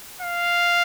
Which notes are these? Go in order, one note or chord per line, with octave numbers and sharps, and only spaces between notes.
F5